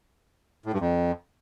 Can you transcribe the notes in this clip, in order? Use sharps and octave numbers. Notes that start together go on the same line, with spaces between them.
A2
G2
F2